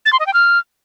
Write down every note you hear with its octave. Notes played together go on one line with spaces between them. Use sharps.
A6
C6
D#5
G5
F6